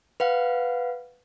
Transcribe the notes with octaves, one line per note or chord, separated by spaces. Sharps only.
B4 F5 F#5